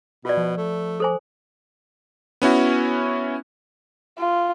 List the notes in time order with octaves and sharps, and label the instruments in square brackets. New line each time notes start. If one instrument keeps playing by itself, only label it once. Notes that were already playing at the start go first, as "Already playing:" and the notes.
[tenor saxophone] B2 [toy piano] F4 D5
[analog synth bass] F3
[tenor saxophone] A3
[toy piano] A4 C5 G#5
[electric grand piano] B3 C#4 E4 F#4
[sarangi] F4